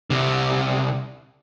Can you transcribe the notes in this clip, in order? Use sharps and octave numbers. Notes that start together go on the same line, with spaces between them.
C2 C3